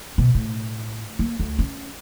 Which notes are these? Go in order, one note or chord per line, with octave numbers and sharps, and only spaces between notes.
B2
A2
A#3
D2
C#4